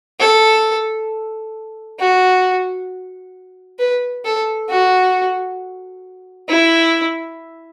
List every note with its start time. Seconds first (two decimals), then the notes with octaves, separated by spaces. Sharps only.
0.20 A4
1.99 F#4
3.79 B4
4.25 A4
4.69 F#4
6.49 E4